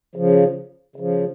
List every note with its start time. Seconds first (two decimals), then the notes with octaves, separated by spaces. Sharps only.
0.16 C#3 F3
0.96 C#3 F3